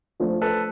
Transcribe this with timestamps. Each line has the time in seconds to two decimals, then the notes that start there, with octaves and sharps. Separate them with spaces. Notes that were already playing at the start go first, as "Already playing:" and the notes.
0.20 F3 A3 D4
0.41 A4 B4